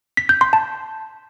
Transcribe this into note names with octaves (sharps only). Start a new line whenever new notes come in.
B6
G6
C6
A5